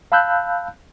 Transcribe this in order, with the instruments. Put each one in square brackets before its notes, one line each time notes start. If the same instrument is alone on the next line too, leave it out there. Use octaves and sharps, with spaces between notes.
[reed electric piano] F5 A5 B5 E6 F#6 G6